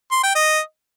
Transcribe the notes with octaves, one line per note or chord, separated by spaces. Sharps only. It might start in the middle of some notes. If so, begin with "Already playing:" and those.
C6
G5
D#5